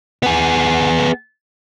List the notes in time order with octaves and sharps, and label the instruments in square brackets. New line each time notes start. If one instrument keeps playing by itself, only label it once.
[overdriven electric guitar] B3 G#4